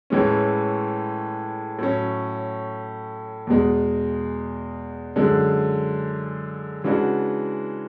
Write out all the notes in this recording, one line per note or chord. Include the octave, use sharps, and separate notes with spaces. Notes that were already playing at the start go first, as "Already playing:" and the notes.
A2 E3 G#3 C#4
A2 F#3 C#4
E2 B2 G#3
F#2 D3 G#3
C#3 E3 G#3 D4 F#4